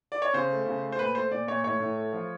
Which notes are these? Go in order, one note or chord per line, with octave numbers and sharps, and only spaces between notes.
D5
C#5
C#3 C5
A3
C#3
A3
C5
A#2 B4
A3 C5
A#2 D5
A#2 C#5
A2 C#5
A2
A3
F3